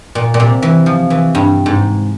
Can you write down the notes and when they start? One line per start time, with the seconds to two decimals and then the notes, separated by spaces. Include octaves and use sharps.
0.15 A#2
0.34 A#2
0.40 C3
0.62 E3
0.86 F3
1.10 E3
1.35 G2
1.66 G#2